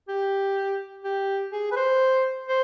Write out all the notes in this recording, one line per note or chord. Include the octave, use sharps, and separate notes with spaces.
G4
G4
G#4
B4
C5
C5